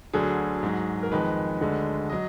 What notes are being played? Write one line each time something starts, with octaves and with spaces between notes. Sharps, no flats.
D2 D3 F#3 G#4
G#2 F#3
A#4
F2 D#3 G#3 B4
D2 D3 G#3
F#3 D#5